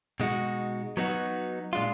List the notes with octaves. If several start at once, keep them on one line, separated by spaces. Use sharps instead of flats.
B2 G#3 D#4 F#4
F#3 B3 D#4 F#4
A#2 G#3 D4 F4